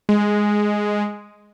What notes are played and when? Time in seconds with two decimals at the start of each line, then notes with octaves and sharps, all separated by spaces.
0.09 G#3